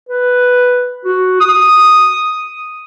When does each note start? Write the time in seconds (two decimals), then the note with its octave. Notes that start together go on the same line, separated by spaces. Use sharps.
0.09 B4
1.05 F#4
1.40 D#6